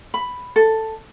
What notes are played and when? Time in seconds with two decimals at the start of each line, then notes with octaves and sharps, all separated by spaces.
0.14 B5
0.56 A4